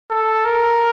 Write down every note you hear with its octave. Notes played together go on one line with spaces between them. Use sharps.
A4
A#4